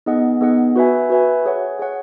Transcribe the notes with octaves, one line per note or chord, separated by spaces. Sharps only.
B3 D#4 G#4 D#5 F#5
B3 D#4 G#4 D#5 F#5
F#4 B4 E5 G#5
F#4 B4 E5 G#5
G#4 C#5 F#5
G#4 C#5 F#5